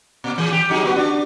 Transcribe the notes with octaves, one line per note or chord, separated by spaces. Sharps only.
A#2
E3 G#4
G4
F#3 D#4 G#4
B3 F#4 B4
D4